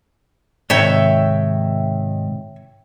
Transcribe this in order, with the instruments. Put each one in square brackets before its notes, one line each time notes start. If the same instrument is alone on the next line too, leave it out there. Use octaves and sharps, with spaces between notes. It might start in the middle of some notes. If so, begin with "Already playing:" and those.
[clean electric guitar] G#2 C3 D#3 [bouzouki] C#5 E5 G5